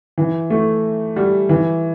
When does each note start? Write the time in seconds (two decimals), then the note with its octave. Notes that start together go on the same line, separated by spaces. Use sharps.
0.18 E3
0.50 A3
1.16 G3
1.49 E3